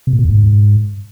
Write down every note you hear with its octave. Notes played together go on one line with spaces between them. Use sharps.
C3
A#2
B2
E2
G#2